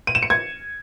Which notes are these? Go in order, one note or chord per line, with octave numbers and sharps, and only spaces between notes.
D#7
E7
C#7
G#6